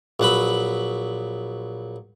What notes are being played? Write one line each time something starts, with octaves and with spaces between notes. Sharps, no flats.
A#1 F#3 B4 B5